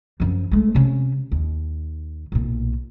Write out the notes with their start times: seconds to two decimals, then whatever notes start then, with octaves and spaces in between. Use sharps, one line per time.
0.20 F#2 F3
0.51 G#3 A3
0.75 C3 C#4
1.32 D#2
2.32 B1 A#2